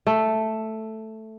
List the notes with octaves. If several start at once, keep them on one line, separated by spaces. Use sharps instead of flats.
A3